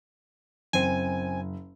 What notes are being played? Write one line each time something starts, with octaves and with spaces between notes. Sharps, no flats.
F#1 C4 G#5